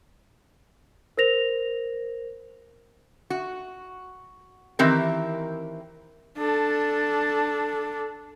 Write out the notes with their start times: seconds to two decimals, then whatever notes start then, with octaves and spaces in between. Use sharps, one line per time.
1.17 A#4 C5 A#6 F7
3.30 F#4
4.79 D#3 E3 C4 G4 A#4
6.38 D4 A4